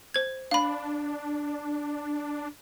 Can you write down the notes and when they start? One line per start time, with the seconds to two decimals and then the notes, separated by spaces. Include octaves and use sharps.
0.14 C5 G#6
0.51 D4 F5 B5